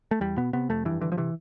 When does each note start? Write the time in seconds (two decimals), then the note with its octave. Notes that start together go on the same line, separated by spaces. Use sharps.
0.11 A3
0.21 E2 G3
0.37 B2 B3
0.53 C3 B3
0.69 F2 A3
0.85 G2 E3
1.01 D3 E3
1.12 F3
1.17 C3 E3